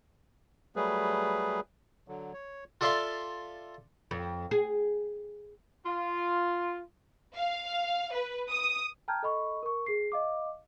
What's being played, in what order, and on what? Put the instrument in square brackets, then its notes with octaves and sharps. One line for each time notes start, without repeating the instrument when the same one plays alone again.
[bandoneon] F#3 G3 A3 G#4 B4
D3 F#3
C#5
[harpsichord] F4 A4 D5 E5 F5 C6
[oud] F2
G#4
[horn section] F4
[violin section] F5
B4
D#6
[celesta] G5 A5 A#5 F6 G6 G#6
A4 D#5 B5 C#6
A#4 C#6
G#4 C7
D#5 F5 D6